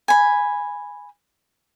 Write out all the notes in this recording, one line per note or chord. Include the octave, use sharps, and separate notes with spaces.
G#5 B5